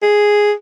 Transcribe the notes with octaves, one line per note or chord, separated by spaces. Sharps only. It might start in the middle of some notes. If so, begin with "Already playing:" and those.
G#4